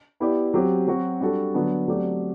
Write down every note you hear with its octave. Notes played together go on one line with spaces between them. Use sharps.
B3 E4 G4 D5
F#3 C4 G4
F#3 C4 F#4
G3 D4 F#4 A4
D3 F#3 B3 D4
F#3 A3 C4 G4 D5